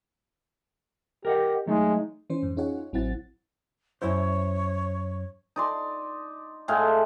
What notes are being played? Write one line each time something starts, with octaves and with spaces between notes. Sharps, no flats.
G4 A#4 D#5 F#5
F#3 G#3 A3 D#4
E3 C#4 C5
F2 G#2
C#4 D#4 F4 G#4 C#5 F#5
A1 F#3 C4 E4 F#5 A6
F#2 E4 C5 C#5
D#4 D5 C6
A2 G#3 F5